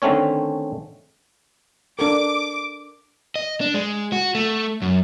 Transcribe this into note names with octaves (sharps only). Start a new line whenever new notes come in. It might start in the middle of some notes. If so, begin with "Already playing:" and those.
D3 D#3 A3 C4 C#4 C#5
D4 A4 A#4 D6
D#5
D4
G#3
F#4
A3
F#2